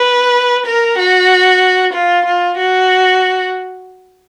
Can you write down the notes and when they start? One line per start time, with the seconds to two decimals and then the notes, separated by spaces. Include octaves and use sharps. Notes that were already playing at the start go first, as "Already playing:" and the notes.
Already playing: B4
0.67 A#4
0.99 F#4
1.94 F4
2.26 F4
2.58 F#4